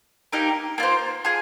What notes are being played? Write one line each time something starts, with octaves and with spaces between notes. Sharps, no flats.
A#3 D#4 G4 A#4
A#3 F4 C5
F4 G#4